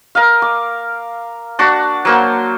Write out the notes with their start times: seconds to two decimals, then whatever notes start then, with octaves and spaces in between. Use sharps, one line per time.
0.15 A#4 D#5 F5
0.42 D6
1.59 D4 F#4 D5
2.05 F#3 A#3 C5